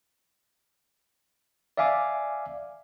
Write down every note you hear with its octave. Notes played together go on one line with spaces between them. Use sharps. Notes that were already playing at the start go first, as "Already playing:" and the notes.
D5 E5 F5 G#5 D6